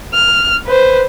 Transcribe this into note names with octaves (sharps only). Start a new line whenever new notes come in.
F6
B4 C5